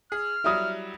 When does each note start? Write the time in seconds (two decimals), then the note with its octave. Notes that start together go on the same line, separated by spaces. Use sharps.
0.12 G#4 F6
0.44 F#3 G3 E4 E5 D#6